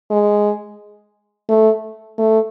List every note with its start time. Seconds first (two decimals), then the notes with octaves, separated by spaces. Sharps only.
0.10 G#3
1.49 A3
2.18 A3